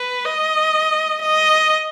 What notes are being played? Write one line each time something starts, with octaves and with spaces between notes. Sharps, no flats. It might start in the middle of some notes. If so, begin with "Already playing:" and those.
Already playing: B4
D#5
D#5